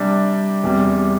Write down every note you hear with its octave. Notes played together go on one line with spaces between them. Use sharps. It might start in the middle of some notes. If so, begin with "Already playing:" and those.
Already playing: C3 G3 D4
E2 C3 G3